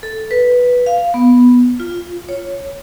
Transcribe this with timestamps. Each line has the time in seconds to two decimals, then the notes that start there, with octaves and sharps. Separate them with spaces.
0.03 A4
0.31 B4
0.86 F5
1.14 B3
1.80 F4
2.29 C#5